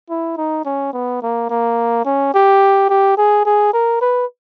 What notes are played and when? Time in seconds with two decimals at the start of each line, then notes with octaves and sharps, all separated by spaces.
0.10 E4
0.37 D#4
0.65 C#4
0.93 B3
1.22 A#3
1.50 A#3
2.05 C#4
2.34 G4
2.89 G4
3.17 G#4
3.46 G#4
3.73 A#4
4.01 B4